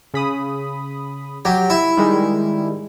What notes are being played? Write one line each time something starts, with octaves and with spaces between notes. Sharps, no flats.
C#3 B5 D#6
F#3 G4
E4
D#3 G3 G#3